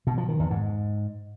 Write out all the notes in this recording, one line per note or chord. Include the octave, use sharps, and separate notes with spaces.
B2
F3
D#3
E2
G#2